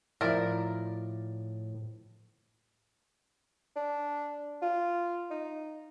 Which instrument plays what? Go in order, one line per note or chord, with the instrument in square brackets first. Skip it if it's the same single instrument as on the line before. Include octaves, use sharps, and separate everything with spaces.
[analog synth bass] A2 [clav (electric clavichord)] F3 E4 [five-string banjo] A#4 D5
[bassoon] D4
F4
D#4